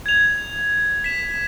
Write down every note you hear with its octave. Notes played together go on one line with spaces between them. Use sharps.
G#6 F7
B6 E7